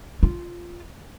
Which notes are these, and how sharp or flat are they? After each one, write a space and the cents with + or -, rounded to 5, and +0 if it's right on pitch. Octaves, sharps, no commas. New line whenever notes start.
F4 -5